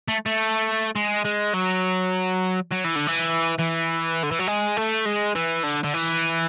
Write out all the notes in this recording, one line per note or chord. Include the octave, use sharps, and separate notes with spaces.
A3
A3
G#3
G#3
F#3
F#3
E3
D3
E3
E3
D3
E3
F#3
G#3
A3
G#3
E3
D3
D3
E3